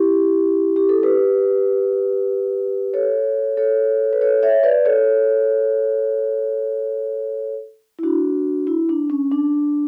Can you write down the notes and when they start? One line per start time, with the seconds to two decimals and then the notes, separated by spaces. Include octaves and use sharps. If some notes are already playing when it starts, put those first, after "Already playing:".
Already playing: E4 G4
0.76 G4
0.89 A4
1.03 G4 B4
2.94 A4 C#5
3.57 A4 C#5
4.13 B4
4.21 A4 C#5
4.43 C#5 E5
4.63 B4 D5
4.85 A4 C#5
7.99 E4
8.03 D4 F#4
8.67 E4
8.89 D4
9.10 C#4
9.32 D4